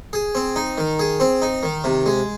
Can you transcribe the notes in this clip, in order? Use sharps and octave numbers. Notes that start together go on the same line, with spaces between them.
G#4
C4
D#4
D#3
G#4
C4
D#4
D#3
C3
G#3